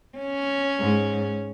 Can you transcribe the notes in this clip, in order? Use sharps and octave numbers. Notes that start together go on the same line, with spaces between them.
C#4
G#2